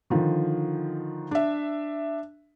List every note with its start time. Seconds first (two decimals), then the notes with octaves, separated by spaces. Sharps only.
0.10 D3 D#3 F3
1.31 D4 E5